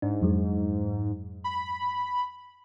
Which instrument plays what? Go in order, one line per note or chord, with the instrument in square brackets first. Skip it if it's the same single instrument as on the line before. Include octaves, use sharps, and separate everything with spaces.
[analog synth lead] G#2 [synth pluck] D4
[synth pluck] F2 F#3 G#3
[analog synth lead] B5